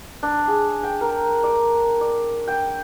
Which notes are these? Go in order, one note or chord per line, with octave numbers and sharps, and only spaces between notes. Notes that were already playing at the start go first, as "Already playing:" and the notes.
D4
G#4
G5
A#4
D5
D5
G5